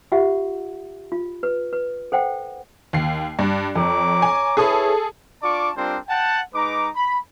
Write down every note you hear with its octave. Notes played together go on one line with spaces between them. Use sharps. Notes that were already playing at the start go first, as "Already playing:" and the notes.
F4 G4 E5 F#5
F4
B4
B4
A4 C5 F#5 G5
D#2 C7
G2
F2 C#5 A#5 D6
G#5
E4 G#4 A4 B4 C#5 D#6
D4 F4 D5 A5 C#6 D6
G3 C4 D4 F4 A#4 C5
F#5 G5 A5
G#3 D#4 B4 A#5 D6
B5